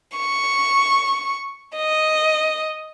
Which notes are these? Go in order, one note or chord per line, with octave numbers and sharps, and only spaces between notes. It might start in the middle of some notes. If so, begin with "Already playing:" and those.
C#6
D#5